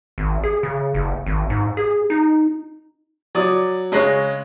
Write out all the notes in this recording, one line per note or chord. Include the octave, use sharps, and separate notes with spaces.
G#1
G#4
C#3
F#1
G#1
G#2
G#4
D#4
F#3 D5 D#6
C#3 G#3 C#5 F#6 A#6